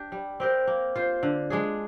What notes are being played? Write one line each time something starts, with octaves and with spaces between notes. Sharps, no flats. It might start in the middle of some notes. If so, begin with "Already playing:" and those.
Already playing: D4 G4
G3
C4 G4 A#4
A#3
F4 C5
D3
G#3 D4 G#4